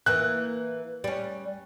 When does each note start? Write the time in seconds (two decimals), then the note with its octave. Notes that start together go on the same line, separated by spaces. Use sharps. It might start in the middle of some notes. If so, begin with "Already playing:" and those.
0.06 E3 A#3 F#6
1.04 G3 C#4